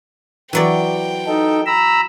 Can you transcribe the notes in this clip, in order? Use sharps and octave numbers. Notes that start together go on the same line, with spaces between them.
E3 F#3 D5 G5
D#4 A4
A#5 B5 E6